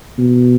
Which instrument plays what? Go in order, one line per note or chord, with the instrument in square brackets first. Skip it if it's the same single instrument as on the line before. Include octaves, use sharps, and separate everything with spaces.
[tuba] B2